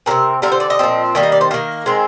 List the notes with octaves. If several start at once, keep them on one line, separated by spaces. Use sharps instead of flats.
C3 G3 C4 A#4
D3 G3 C4 A#4
C5
D5
D#5
A#2 F3 C4
D#3 G3 A#3
D#5
D5
C5
D#3 A#3 A#4
D#3 G#3 C4